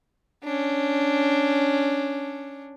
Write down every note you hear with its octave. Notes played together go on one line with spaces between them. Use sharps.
C#4 D4